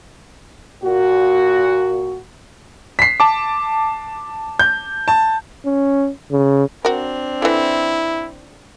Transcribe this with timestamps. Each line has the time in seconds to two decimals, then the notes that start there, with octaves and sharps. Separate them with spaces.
0.83 A#2 F#4
2.99 B6 C7
3.20 A5 D6
4.59 G6
5.08 A5
5.66 C#4
6.31 C#3
6.85 C4 D4 F#4 A#4
7.42 D3 E3 E4